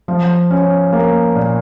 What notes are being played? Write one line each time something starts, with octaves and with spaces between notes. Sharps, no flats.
F3
C#4
A#3
A#2